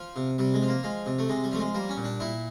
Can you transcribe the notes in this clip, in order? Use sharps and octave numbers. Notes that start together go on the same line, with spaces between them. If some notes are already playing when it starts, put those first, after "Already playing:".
Already playing: F3
C3
C3 G3
G#3
F3
A#3
F3 G#3
C3
A3
C3 G#3
G3
F3 A3
G#3
G3 A#3
C#4
A#2
D4
A#2 E4